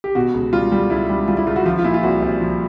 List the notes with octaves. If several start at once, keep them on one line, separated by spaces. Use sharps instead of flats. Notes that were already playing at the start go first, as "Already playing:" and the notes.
G4
B2 F#4
C#2
G3 F4
G3
C#2 E4
G3
G3 F4
E4
C#2 F4
F#4
F3 F4
F4
A#2 E4
F4
C2 F#4
C2
F3